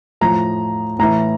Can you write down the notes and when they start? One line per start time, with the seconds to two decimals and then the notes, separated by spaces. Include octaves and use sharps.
0.21 A2 F3 A#5
0.99 A2 E3 A#5